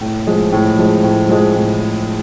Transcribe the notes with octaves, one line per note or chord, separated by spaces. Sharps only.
A2
F3 G#3
A2
F3 G#3
A2
F3 G#3
A2